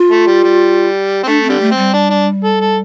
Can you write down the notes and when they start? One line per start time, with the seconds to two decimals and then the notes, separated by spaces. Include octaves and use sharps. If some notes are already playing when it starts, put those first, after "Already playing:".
Already playing: F4
0.10 A3
0.27 G3
0.44 G3
1.23 C4
1.27 A3 D4
1.44 C4
1.49 D3 G3
1.60 A3
1.72 C4
1.77 G3
1.94 D4
2.10 D4
2.44 A4
2.61 A4